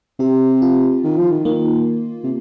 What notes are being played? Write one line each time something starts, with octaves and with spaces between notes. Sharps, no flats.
C3 G4
F4
D#3
F3
D#3
D#3 A#3
C3